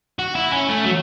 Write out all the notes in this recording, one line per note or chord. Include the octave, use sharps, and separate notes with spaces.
F#4
E4
C#4
A3
F#3